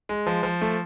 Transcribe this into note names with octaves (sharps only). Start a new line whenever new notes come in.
G#3
F3
F3
A3